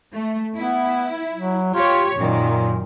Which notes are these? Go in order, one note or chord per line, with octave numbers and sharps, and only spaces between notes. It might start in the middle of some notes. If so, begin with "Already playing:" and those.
A3
B3 E4
F#3
F4 G4 C#5
F#2 A#2 D#3